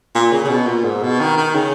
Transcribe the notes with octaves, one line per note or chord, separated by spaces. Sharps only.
A#2
C#3
C#3
B2
A#2
G#2
B2
D#3
D#3
C#3